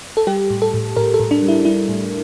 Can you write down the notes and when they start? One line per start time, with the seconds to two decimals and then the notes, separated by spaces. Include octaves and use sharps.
0.17 A4
0.27 G3 G4
0.50 A2
0.62 A4
0.74 A2
0.97 A2 A#4
1.14 A4
1.20 A2
1.31 D4
1.42 G3
1.48 E4
1.65 G3 E4
1.89 A2